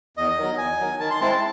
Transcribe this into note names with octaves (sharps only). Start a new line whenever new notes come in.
E2 D#5
D#3 F#3
E2 G#5
D#3 F#3
D#3 A5
C6
G#3 C4 E4 A5
A5